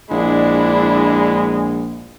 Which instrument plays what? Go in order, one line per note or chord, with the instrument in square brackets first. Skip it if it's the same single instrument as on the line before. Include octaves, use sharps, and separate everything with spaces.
[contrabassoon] A#1 [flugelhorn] G#3 [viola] D4 E4